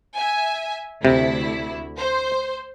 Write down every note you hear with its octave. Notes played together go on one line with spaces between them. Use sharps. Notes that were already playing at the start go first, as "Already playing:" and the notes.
E5 G#5
D2 C3 E4
C5